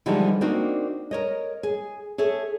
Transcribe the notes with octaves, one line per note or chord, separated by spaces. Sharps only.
D3 E3 F3 G3 G#3 D#4
A#3 C4 D4 D#4 F#4
A#4 C#5 D#5
G#4
G#4 A4 C#5 E5